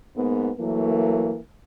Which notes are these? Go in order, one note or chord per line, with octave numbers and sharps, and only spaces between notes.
G#2 A#3 B3
E3 F#3 A3 A#3